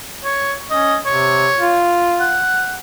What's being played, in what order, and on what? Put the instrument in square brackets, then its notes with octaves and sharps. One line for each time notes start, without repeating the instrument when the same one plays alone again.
[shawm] C#5
[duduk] C#4 [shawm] D#5
[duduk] C3 [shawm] C#5
[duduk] F4
[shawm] F#5